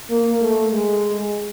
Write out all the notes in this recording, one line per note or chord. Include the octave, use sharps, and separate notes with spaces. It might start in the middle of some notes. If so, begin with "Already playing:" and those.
A#3
A3
G#3